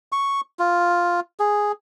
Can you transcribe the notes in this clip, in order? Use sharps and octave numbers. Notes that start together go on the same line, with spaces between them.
C#6
F4
G#4